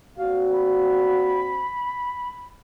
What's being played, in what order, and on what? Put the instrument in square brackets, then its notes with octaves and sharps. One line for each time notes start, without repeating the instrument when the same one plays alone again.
[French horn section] A#2 C4 F#4 [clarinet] F5
[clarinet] B5